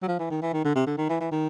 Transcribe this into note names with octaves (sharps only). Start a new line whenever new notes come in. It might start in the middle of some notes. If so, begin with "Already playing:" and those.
F#3
F3
E3
D#3
E3
D#3
D3
C3
D3
D#3
E3
E3
D#3